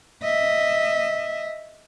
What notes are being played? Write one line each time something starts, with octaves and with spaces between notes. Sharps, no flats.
D#5 E5